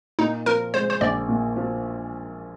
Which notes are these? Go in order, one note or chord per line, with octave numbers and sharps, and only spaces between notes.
A#2 D#4
F3 A#4
G#3 C5
C5
A#1 D5
A#2
F3